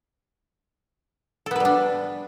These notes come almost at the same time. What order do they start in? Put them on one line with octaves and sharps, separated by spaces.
A4 B3 B4 G3 D4